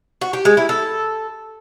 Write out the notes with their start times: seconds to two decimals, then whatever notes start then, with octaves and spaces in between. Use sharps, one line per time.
0.21 F#4
0.33 G4
0.45 G#3
0.57 E4
0.69 A4